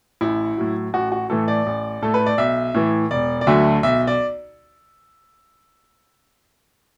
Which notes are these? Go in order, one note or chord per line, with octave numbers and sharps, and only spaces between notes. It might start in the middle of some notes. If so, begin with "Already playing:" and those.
A1 E4
A2 F#3
A1 F#4
F#4
A2 E3 A3 A4
D5
A1
A2 A3 A4
B4
D5
B1 E5
A2 E3
E1 D5
D5
D2 D3 F#3 A3 E5
B1 E5
D5